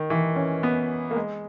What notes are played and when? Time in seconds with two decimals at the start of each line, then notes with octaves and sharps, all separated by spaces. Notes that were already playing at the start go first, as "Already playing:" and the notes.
Already playing: D#3
0.10 E3
0.36 C#4
0.63 B3
1.11 A#3
1.16 G#3